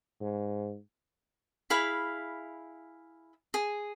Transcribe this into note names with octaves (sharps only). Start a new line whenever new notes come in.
G#2
E4 G#4 F5 B5
G#4